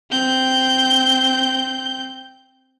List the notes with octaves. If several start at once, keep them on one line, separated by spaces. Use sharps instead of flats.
C4 G6